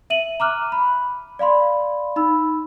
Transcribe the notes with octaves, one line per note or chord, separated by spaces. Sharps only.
E5 D#7 F#7
A#5 D6 F6 F#6
B5
D5 F5 B5 C6
D#4 B5 E6